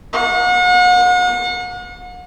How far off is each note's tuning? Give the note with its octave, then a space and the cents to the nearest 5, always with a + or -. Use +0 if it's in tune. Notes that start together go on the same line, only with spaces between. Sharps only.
F#5 -40